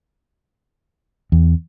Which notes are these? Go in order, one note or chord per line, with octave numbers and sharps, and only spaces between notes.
E2